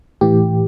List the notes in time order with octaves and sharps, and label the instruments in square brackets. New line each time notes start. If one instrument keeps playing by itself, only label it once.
[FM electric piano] A2 E3 G4